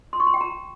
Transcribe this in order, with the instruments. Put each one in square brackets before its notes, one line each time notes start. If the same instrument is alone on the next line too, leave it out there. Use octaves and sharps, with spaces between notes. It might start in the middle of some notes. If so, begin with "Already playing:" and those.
[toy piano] C6
C#6
C6
G5
A#5